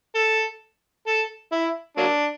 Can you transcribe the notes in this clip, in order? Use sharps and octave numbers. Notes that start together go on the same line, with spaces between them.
A4
A4
E4
F#3 A#3 D4